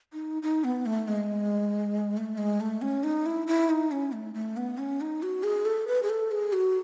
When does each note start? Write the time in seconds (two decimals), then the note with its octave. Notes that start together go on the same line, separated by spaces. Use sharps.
0.13 D#4
0.43 D#4
0.64 B3
0.86 A3
1.08 G#3
2.17 A3
2.38 G#3
2.60 A3
2.82 C#4
3.04 D#4
3.26 E4
3.47 E4
3.70 D#4
3.91 C#4
4.12 A3
4.34 A3
4.57 B3
4.78 C#4
5.01 D#4
5.23 F#4
5.43 G#4
5.65 A4
5.88 B4
6.03 G#4
6.09 A4
6.31 G#4
6.53 F#4